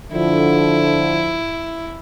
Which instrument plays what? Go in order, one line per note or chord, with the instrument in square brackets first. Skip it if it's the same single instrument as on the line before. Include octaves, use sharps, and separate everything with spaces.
[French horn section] D3 F3 [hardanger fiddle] E4